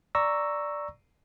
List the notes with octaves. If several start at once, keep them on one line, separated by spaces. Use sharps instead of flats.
D5 A#5 C#6 E6 A#6